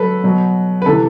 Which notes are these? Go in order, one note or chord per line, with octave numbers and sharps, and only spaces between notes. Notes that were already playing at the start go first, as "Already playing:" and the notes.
Already playing: F#3 A4 B4
B2 F#3
B4
C3 E3 A4